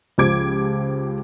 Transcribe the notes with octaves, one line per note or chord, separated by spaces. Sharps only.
C#2 F3 G4 D6 G#6 D7